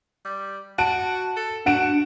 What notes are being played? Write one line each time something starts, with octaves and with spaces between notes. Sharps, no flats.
G3
F#4 A5 D7
A4
D4 F#4 F#5 D7 E7